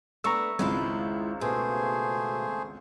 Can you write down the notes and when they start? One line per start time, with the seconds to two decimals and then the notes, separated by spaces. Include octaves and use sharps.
0.24 A3 B3 D4 A#5 C#6 E6
0.59 G#1 C#2 G#3 E4 F4
1.41 B2 A3 G#4 C5